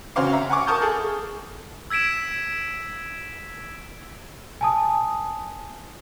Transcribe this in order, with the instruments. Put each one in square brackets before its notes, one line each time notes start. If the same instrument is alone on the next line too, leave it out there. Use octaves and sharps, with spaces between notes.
[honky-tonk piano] C#3 C#4 F#4 C5 F5 D6
E5 A#5
F#5 G#5 C#6 D6
A#4 A5 C#6 D#6 F6 G6
G#4 A4
[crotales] E6 G#6 B6 D7 E7
[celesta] G#5 A5 D#6